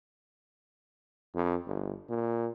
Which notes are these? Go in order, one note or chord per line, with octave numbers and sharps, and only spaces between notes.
F2
G1
A#2